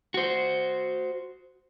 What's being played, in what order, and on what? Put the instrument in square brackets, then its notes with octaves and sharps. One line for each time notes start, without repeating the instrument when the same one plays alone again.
[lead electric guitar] F#4 C5